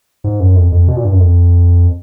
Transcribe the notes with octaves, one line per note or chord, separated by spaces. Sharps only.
G#2
F#2
F2
F2
B2
A#2
G2
F#2
F2